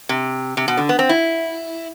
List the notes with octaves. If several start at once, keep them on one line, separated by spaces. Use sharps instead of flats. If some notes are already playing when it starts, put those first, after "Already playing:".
C3
C3
B2
D3
B3
C4
E4